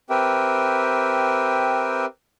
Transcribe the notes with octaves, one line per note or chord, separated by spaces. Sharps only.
C4 G4 A#4 B4 E5 G5